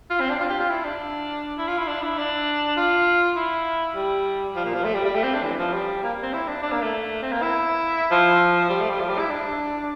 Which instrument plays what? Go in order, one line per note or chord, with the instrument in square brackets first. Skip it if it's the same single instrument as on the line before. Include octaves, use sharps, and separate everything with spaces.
[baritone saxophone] F4
C4
D4
F4
G4
F4
E4
D4
E4
F4
E4
D4
E4
D4
F4
E4
G3
F3
A#2
F3
A3
G3
G3
A3
C4
D4
E3
F3
G3
A#3
C4
E4
D4
D4
A#3
A3
C4
A#3
E4
F3
G3
A3
G3
F3
G3
E4
D4